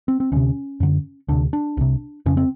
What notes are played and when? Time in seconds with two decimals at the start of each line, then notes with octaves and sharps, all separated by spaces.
0.08 C4
0.20 C4
0.32 D2 C3 C#4
0.80 F#2 D3
1.28 D2 C3 D4
1.53 D4
1.77 C2 C3
2.26 F2 C#3 C#4
2.37 C4